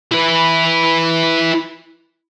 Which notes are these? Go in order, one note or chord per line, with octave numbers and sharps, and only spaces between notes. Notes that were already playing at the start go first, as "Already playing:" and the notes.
E4 B4